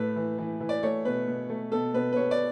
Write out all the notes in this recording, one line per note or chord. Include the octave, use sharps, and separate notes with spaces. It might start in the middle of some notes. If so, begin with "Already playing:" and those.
Already playing: A2 A3 B4
E3
E3
E3
D5
A3 C#5
B2 B4
B2
A3
B2 A4
B2 B4
B4
B2 C#5
D5